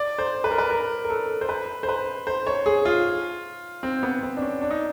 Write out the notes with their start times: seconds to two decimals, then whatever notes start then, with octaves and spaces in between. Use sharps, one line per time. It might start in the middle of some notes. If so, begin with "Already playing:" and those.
Already playing: D5
0.19 C5
0.44 B4
0.51 A#4
0.58 B4
0.70 A#4
1.04 A#4
1.10 A4
1.41 C5
1.49 B4
1.83 C5
1.89 B4
2.27 C5
2.47 C#5
2.66 G#4
2.85 F4
3.83 C4
4.03 B3
4.23 C4
4.37 D4
4.42 C#4
4.61 D4
4.70 D#4